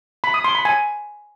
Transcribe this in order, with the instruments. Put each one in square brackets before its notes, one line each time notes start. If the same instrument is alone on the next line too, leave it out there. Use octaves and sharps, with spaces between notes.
[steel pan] B5
D#6
C6
B5
G#5